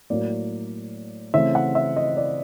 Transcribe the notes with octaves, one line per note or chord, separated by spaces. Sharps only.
A2 F#3 A#3 D5
C#3 E3 A3 C4 E5
F#5
E5
D#5
D5